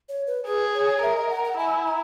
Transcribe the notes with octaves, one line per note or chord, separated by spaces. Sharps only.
C#5
B4
G#4 B4
C#5
A#4 E5
D#5
F#5
F#5
E4 G#5
A#5